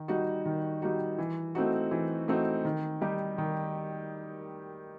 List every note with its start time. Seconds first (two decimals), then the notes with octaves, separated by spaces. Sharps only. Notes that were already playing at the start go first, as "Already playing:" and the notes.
Already playing: D#3
0.08 G3 D#4 F#4
0.45 D#3
0.82 G3 D#4 F#4
1.18 E3
1.55 A3 C4 D#4 F#4
1.91 E3
2.28 A3 C4 D#4 F#4
2.65 D#3
3.01 G3 D#4 G4
3.38 D#3